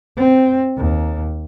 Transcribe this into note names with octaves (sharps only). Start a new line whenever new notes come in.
C4
D#2